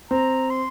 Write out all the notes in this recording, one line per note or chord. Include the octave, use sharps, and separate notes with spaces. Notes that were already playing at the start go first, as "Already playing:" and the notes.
C4 A#5
C6